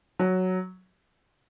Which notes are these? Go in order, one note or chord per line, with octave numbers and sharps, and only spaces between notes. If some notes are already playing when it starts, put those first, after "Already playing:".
F#3